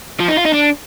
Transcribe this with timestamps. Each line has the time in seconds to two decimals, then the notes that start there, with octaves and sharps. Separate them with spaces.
0.20 F3
0.28 D#4
0.37 F4
0.45 D#4
0.53 D4